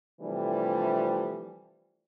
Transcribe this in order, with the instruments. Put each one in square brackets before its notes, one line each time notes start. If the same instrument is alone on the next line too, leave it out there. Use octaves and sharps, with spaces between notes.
[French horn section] C3 E3 F3 G3 A3 D4